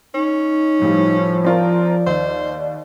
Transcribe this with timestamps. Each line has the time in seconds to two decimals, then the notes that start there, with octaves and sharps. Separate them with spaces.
0.14 C#4 D#4
0.82 A2 F3 G3
1.45 C4 F4 A#4 D5
2.07 D#2 C5